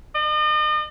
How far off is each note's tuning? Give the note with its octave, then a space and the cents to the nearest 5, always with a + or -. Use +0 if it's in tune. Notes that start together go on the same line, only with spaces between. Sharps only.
D#5 -40